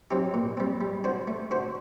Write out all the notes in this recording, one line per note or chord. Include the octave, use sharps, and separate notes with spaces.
F#3 C4 D#4 G4
A#2
G3 C4
G3
D4 F#4 C5
A3
D4 F#4 C5